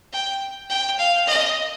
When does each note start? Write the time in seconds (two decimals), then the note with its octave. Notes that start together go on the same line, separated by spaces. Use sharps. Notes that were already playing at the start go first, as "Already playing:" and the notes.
0.13 G5
0.70 G5
0.99 F5
1.27 D#5